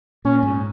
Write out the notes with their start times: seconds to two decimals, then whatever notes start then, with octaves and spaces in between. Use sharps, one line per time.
0.25 A#2 C#4
0.43 G#2